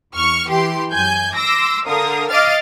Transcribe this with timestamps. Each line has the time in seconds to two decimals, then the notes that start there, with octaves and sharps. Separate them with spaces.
0.15 E2 C#6 F6
0.47 E3 G4 C6 C7
0.93 F#2 G#5 G6
1.36 C6 D6 E6 A#6
1.86 D3 A#4 F5 D#6
2.29 D#5 F5 D6 F6 A6